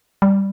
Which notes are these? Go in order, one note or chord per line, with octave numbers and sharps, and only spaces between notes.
G3